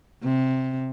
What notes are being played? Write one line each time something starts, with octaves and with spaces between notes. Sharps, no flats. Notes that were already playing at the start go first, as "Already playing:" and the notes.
C3